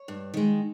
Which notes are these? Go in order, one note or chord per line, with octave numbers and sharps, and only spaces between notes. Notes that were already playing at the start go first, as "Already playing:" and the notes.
Already playing: C#5
G2
D#3 G#3